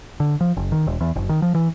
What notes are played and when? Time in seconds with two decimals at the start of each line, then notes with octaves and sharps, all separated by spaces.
0.20 D3
0.41 F3
0.57 F#1
0.72 D#3
0.87 E1
1.01 E2
1.16 F#1
1.29 D#3
1.42 F3
1.55 E3